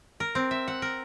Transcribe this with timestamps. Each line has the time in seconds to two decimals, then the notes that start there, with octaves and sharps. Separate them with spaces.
0.20 A#4
0.35 C4
0.51 E5
0.68 F#5
0.82 A#4